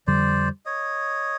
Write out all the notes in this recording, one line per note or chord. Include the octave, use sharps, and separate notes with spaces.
F2 D3 G3 C5 D5
C#5 D#5